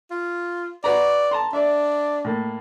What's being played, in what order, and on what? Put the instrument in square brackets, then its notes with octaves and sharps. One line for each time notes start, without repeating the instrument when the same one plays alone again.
[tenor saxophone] F4
[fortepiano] F#4 B4 A#5 [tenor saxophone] D5
[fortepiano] A5 A#5 C6
[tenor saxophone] D4 [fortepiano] D5 E5
[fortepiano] A2 A#3